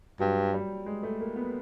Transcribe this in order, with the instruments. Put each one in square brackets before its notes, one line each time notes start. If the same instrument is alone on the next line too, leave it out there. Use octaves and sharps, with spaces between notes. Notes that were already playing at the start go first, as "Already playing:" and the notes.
[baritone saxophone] G2 [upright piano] F#3
[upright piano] G3
G#3
A3
A#3
B3